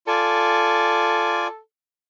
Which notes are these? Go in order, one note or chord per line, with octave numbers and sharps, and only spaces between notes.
F4 A4 D5 G#5